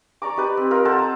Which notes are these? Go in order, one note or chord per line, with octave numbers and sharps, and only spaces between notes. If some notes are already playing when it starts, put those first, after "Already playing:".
C#5 D5 A#5 D6
D#4 G4 B4 D5
C4
F4 A#4 D#5
A4 C5 F#5 A5
A#5